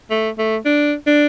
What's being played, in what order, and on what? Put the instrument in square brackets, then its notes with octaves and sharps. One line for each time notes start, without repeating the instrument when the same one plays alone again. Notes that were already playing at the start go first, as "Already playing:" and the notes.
[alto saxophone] A3
A3
D4
D4